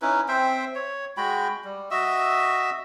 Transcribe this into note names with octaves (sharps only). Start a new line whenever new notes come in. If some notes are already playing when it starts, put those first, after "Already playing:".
C#4 D#4 E4 B4
C4 C5 E5 G5
C#5
G#3 F#4 G5 B5
G3
F#4 D#5 E5 E6